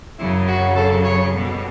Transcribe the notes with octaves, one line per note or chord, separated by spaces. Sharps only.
F#2 C#3 F#3 E4
F#4
A4
C#5
B2 G3